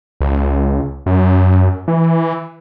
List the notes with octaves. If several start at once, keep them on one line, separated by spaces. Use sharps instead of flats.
C#2
F#2
E3